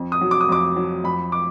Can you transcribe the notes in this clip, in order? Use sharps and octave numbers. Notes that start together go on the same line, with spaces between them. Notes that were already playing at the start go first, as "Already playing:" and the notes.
Already playing: F2
D#6
F#3
D6
D#6
F2 D6
F#3
F2 B5
D6